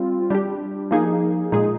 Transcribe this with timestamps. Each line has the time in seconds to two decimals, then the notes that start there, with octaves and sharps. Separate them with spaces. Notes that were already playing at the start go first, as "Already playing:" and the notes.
Already playing: G3 C4 F4
0.30 G3 D4 G4
0.91 F3 A#3 D#4 G#4
1.52 A#2 G#3 D#4 G#4